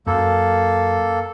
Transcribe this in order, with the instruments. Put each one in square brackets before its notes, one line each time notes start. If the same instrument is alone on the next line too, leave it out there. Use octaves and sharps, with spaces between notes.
[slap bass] F#2 [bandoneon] A#3 A4